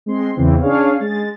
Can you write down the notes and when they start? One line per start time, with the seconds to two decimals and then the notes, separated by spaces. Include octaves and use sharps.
0.06 G#3 C4 C6
0.35 E2 C#3 E3 C4
0.61 C#4 D4 G#4 C#5 F5
1.00 G#3 A6